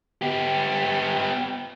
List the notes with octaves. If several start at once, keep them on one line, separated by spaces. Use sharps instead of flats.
B3 G4